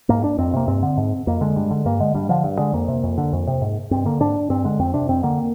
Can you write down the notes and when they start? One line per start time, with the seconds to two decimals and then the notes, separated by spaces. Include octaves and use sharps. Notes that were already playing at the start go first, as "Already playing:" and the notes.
0.09 G#2 A#3
0.24 D4
0.38 F2 C4
0.54 C3 A#3
0.68 G2 C4
0.83 D3
0.97 G#2
1.27 F2 A#3
1.41 D3 G#3
1.56 G2
1.71 D3
1.85 G2 A#3
2.00 D3 G#3
2.15 G2 G3
2.29 D3 F3
2.44 G2
2.58 D3 G#3
2.73 F2 A#3
2.88 C3
3.03 F2
3.18 D3
3.33 F2
3.47 C3
3.62 G#2
3.91 G2 C4
4.06 D3 A#3
4.20 G#2 D4
4.50 G2 C4
4.65 D3 G#3
4.79 F2 C4
4.94 C3 D4
5.08 F2 C4
5.23 D3 A#3